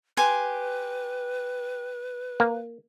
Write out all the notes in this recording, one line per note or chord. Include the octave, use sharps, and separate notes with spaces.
G4 B4 G#5 C6
A#3